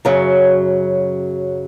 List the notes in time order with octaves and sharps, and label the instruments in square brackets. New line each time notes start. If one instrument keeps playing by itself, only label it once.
[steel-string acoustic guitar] F#2 C#3 F#3